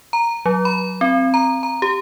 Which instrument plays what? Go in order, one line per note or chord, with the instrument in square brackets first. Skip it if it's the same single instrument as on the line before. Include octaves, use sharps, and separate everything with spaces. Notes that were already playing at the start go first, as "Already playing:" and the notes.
[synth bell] A#5
F#3
B5
C4
A#5
A#5
G4